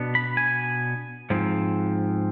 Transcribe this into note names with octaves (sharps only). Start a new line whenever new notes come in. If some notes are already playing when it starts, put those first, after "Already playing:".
Already playing: B2 B3 D4
B5
G#5
G#2 F3 C4